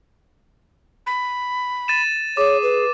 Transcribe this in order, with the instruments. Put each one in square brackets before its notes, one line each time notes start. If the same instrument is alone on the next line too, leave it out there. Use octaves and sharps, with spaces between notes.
[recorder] B5
[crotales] A6 D#7 E7
[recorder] G#4 [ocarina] C#5 [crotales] D6
[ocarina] B4